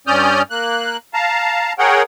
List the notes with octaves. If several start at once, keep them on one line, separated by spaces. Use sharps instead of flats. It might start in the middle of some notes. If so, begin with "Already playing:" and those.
G2 C#4 D5 D#6 F6 G6
A#3 F#6
F5 A5 A#5
G#4 A#4 C#5 F#5 G5